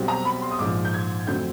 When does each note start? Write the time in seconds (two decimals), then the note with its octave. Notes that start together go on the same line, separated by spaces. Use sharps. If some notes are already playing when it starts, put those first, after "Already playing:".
Already playing: B1 B2 G3 C4
0.08 A#5
0.25 B5
0.42 C6
0.51 D#6
0.59 A#1 G#2 F3 D6
0.85 G6
0.94 G#6
1.27 F2 D3 F#3 A3 C4 G6